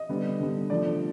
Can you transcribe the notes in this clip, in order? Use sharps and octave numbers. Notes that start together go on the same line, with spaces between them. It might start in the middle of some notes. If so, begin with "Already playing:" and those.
Already playing: D#5
D3 G3 B3
D3 G3 B3
D3 F3 A3 D5